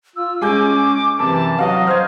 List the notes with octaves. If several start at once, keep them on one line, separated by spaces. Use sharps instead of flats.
F4 E6
G#3 C#4 G#5 D6 G6
F#2 C3 E3 A5
F#3 F#4 D#5 F5
C5 F6 G#6